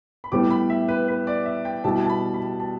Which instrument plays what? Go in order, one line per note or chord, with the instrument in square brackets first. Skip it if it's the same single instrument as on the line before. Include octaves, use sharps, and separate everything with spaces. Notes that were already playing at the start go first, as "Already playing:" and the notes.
[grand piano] B5
[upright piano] A2 G3 B3 [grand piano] D6
[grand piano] B5
E5
B4
B4
D5
E5
G5
[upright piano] B2 G3 E4 G4 [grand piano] A5
[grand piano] A5
B5
B5
A5